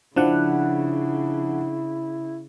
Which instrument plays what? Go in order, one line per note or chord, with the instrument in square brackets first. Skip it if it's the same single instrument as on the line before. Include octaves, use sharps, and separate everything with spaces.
[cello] C#3 [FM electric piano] F3 F#5 [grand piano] D4 [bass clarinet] E4